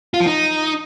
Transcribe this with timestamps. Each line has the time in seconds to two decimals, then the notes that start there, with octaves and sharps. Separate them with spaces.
0.14 F4
0.20 F3
0.27 D#4